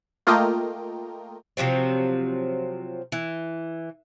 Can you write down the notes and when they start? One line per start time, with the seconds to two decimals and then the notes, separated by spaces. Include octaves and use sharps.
0.27 A3 A#3 F4 A#4 D#5 G5
1.57 C3 F3 F#3 C4
3.12 E3